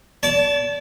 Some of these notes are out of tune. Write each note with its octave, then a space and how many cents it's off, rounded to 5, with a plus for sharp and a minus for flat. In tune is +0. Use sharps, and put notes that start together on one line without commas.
D5 -35 A5 +0